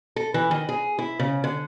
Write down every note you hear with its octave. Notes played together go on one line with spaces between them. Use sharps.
A4
E3
D#3
G#4
E4
C#3
D3